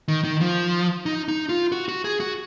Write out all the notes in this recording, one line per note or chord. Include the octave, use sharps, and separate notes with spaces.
D#3
D#3
F3
D#4
D#4
F4
F#4
F#4
G#4
F#4